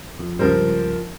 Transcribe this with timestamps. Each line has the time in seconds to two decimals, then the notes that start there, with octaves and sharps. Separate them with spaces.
0.19 F2
0.39 C#2 G2 F3 A#4 C5